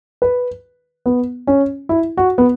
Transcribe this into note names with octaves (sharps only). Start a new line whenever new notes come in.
B4
B3
C#4
E4
F#4
B3